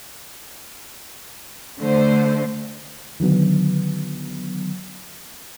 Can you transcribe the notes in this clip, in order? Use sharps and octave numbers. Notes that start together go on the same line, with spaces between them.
D3 A3 C5
D3 D#3 F#3 B3